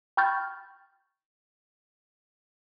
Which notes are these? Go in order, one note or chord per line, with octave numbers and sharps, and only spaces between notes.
G5 B5 C#6 F6 G6 A6